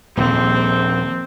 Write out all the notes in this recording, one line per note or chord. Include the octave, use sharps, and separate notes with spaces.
D#1 A#1 C3 C4